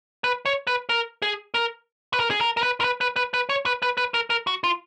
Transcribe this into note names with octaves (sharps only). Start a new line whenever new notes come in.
B4
C#5
B4
A#4
G#4
A#4
B4
A#4
G#4
A#4
A#4
B4
A#4
B4
B4
B4
B4
C#5
B4
B4
B4
A#4
A#4
F#4
F4